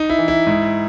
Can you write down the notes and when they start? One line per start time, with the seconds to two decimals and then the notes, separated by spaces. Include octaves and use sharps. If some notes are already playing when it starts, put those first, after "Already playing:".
Already playing: D#4
0.09 E4
0.18 E3
0.28 E4
0.47 G#2